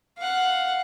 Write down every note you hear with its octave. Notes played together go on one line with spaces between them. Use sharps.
F5 F#5